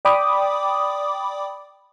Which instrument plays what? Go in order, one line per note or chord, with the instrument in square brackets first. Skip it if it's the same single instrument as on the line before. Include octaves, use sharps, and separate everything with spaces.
[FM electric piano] D5 G5 B5 D6 D#6